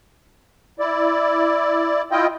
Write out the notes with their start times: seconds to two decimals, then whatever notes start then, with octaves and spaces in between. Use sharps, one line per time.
0.79 E4 D5
2.11 E4 F4 D#5 G5